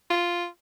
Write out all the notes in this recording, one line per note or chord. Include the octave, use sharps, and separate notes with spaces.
F4